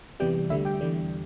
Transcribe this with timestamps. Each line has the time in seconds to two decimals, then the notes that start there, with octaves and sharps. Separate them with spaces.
0.20 E2 C3 E3 G3 G4 G5
0.50 D2 D3 G3 E4 E5
0.65 G4 G5
0.81 E2 D3 G3